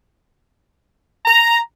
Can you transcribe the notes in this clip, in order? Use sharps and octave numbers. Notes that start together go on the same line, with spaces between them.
A#5